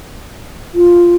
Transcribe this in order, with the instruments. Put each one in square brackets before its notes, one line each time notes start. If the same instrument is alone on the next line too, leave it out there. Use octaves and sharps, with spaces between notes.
[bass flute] F4